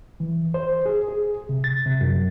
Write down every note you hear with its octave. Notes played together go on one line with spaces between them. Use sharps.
E3
C5
G#4
G#4
C3
A6
C3
F#2